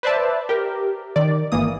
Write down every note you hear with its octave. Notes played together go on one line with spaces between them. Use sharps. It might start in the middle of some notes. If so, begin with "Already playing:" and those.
B4 C5 D5 E5 A5
G4 A#4
D#3 D5
G#1 E3 A#3 D#6